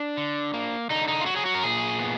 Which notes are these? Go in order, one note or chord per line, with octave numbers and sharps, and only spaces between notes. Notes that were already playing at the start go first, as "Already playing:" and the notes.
Already playing: D4
D3
A#3
D3 D#4
D#4
F4
F#3 F#4
G#4
F#4
A#4
A#2 G#4
B3